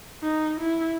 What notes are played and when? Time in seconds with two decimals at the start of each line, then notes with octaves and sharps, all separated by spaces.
0.23 D#4
0.60 E4